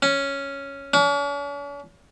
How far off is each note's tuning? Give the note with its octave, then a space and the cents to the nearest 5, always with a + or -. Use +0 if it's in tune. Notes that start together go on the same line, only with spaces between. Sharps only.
C#4 +0
C#4 +45